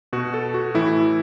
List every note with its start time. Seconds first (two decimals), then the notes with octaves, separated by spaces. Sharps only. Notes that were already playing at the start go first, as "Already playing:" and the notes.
0.13 B2 F#4
0.34 A4
0.54 F#4
0.74 A2 E3 E4